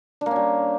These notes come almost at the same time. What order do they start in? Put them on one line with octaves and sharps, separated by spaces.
D4 A#3 C#4 G3